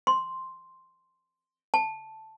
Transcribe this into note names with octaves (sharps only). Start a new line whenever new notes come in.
C6
A5